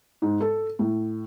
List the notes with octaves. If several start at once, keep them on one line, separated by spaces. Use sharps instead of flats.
G#2
A4
A2